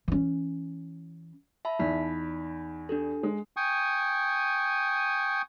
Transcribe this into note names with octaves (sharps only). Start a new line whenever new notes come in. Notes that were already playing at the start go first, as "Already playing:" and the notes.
E3 C#4
E5 A5 B5
E2 D#4 B5 B6
D4 G4 A4
G#3
G5 G#5 C#6 D#6